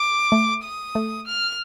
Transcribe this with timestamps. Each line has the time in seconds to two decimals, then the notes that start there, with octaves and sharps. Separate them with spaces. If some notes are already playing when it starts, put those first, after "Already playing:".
Already playing: D6
0.32 A3
0.63 D#6
0.95 A3
1.26 F6